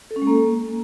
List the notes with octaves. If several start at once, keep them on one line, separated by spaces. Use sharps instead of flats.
A4
C#4
G#3
A#3